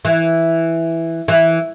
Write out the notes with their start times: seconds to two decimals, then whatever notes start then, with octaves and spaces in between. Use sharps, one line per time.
0.05 E3
1.28 E3